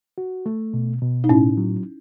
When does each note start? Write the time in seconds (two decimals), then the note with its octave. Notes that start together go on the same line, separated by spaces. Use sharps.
0.18 F#4
0.46 A3
0.74 B2
1.01 B2
1.24 D#4
1.29 A2 C#4 E4
1.57 F#3